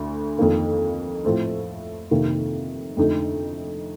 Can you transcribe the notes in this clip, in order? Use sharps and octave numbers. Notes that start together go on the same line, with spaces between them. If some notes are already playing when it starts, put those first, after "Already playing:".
Already playing: D2 D3
F2 D#3 A#3
A2 F3 A3 C4
F2 C3 D#3 A#3
F2 D3 A3 D#4